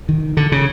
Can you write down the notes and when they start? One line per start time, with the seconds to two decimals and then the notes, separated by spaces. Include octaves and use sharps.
0.09 D#3
0.37 D3
0.52 C#3